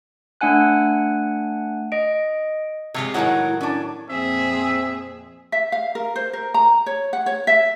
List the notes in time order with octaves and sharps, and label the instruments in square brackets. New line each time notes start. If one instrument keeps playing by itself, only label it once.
[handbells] A3 D4 F#5 G#5 F#6
D#5 D7
[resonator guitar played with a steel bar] C3 [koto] G#3 F4 C#5
[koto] A2 D#3 F#3 [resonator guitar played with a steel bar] G#3 C#5 F#5 [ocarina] E4
[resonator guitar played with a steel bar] C#4 D4 [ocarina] E4
[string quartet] F2 A#2 G#4 [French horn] C4 [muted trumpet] E5
[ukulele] E5
F5
A#4
C5
A#4
A#5
C#5
F#5
C#5
E5